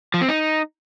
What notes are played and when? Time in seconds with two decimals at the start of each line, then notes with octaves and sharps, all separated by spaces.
0.14 F3
0.21 C4
0.29 D#4